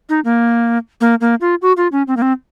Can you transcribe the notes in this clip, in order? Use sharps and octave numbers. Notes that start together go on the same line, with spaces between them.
D#4
A#3
A#3
A#3
F4
F#4
F4
C#4
C4
A#3
C4